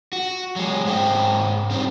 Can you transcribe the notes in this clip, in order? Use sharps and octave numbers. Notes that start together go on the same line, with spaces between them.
F#4
F#3 G#3
G#2 G#3 C5 E5 G5
G2 C4 D#4 C5